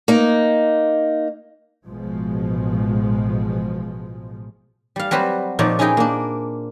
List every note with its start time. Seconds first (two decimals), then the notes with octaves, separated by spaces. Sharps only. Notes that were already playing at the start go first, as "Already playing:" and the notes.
0.08 A#3 D#4
1.85 A1 B2 F3 G#3
4.96 G3 F5
5.11 F#3 G3 C4 F#4 B4 C5
5.59 A#2 F3 D#4 C#5 D5
5.79 C#4 D#4 E4 G#4 D#5 G5
5.97 A#3 D4